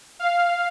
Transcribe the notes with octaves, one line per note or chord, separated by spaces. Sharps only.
F5